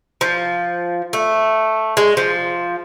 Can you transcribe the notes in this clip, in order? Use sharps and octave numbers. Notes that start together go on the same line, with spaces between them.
F3
A3
G#3
F3